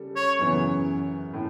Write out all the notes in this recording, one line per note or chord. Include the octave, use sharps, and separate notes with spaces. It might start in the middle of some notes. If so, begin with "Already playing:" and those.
Already playing: C#3 G3 A4
C#5
F#2 C#3 E3 B3
A2